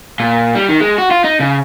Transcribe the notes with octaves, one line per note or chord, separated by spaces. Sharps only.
A#2
G3
D#3
G#3
F#4
F4
D#4
C#3